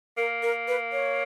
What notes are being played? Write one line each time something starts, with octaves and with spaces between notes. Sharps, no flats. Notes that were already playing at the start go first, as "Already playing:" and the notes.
A#3 A#4
A#4
B4
C#5